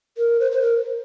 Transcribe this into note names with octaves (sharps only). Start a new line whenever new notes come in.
A#4
C5
C5
A#4